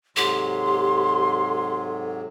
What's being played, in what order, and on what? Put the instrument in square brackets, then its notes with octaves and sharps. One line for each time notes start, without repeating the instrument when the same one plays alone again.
[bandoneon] G#2 C3 F#3 [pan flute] G4 [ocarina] A4 [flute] C6